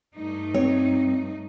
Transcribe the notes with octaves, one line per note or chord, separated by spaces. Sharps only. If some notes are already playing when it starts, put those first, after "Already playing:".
G2 A3 D#4
C4 C#5